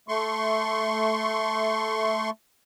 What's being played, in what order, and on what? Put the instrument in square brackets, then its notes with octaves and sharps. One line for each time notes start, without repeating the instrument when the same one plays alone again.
[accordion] A3 C6 C#6